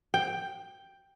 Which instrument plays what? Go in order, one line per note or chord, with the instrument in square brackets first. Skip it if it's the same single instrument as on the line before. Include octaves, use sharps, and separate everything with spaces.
[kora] G5